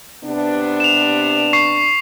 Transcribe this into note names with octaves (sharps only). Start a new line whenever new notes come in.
C3 B3 D4
E7 F7
C#6 C7